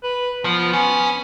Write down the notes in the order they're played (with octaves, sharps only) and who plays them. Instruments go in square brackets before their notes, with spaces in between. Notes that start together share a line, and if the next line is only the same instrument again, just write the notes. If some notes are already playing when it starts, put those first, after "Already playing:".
[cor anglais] B4
[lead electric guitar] F3 [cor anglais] B3
[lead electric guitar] C#4